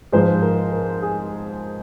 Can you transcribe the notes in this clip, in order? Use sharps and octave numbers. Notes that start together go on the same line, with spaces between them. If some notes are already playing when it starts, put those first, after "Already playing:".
G#2 F3 C5
A#4
A#4
G#4